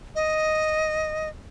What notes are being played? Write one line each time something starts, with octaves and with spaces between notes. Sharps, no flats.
D#5